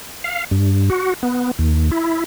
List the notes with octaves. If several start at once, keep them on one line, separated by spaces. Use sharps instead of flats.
F5
G2
F#4
B3
D#2
E4